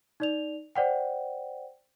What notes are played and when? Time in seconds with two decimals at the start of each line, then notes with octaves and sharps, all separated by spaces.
0.20 D#4 D5 F7
0.75 C5 D5 F#5 G5